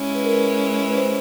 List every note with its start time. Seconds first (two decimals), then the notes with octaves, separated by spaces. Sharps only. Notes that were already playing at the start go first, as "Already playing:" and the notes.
Already playing: G#3 C#4 E4
0.15 B4
0.25 A#4
0.33 B4
0.90 B4
0.96 C5